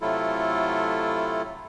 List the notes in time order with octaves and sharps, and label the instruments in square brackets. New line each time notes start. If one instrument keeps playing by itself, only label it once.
[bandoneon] C3 F#3 A3 E4 F4 A4